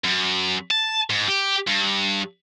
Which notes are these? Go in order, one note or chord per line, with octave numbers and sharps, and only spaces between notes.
F#2
A5
G#2
G4
G2